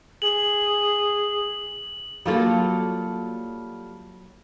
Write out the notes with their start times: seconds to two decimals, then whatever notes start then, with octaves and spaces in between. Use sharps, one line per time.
0.22 G#4 F#7
2.26 F#3 G3 A#3 F4 A4